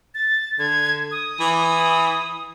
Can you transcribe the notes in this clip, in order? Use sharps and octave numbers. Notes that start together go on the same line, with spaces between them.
A6
D3 G#6
D#6
E3